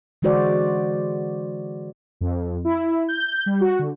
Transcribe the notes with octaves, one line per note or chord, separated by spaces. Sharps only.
D3 E3 G#3 F#4 C5 D5
F2
E4
G6
G3
F#4
D3